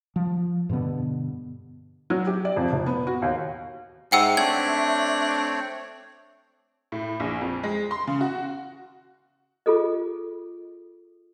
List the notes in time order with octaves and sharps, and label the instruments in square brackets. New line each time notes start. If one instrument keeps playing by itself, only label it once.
[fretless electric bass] F3
G2 B2 D3 B3
[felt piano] F#3
G4
D5
F2
F1
B3
F#4
D#2
[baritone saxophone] G#2 [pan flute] E5 [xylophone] F#5 G5 E6
[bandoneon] A3 C4 C#5 [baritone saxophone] D4 [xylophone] G#6
[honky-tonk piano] A2
A#1
F2
G#3
C6
C#3
F#4
[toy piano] F4 G#4 A4 D#5